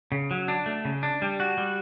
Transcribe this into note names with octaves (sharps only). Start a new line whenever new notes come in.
C#3
F#3
D4
A3
C#3
D4
G3
F#4
G3